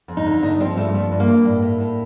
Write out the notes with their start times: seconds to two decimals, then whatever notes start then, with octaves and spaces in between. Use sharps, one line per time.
0.08 F2
0.17 D#4
0.26 D3
0.43 G2 D#4
0.60 F3 C4
0.77 G2 A3
0.94 F3 A3
1.12 G2
1.20 A#3
1.28 G2
1.45 A2
1.62 A2
1.80 A2